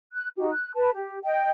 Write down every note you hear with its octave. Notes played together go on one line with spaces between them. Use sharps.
F#6
D#4 F#4 G4
F#6
B4 A5
G4
D#5 G5